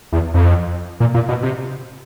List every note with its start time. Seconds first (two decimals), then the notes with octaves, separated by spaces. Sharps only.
0.12 E2
0.34 F2
1.00 A#2
1.14 A#2
1.29 B2
1.43 C3